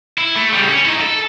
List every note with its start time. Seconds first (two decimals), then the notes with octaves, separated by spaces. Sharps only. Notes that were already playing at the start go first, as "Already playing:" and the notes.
0.18 E4
0.36 A3
0.53 C#3 G3
0.68 C#4
0.85 D#4 E4
1.01 A4